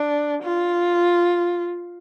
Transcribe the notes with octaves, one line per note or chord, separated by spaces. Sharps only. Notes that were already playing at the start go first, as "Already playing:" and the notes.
Already playing: D4
F4